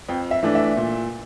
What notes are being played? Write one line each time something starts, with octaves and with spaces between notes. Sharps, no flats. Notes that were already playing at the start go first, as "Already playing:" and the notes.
F2 G5
E5
E3 A3 D4
E5
A#2